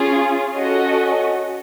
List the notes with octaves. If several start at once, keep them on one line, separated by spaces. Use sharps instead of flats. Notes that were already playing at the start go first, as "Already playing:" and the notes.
Already playing: C#4 F4 G#4
C#4 F#4 A4 D#5